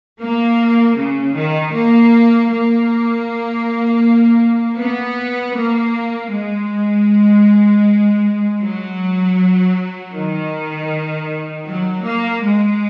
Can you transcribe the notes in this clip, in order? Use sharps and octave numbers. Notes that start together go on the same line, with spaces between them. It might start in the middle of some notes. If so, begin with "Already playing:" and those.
A#3
C#3
D#3
A#3
A#3
B3
A#3
G#3
F#3
D#3
F#3
A#3
G#3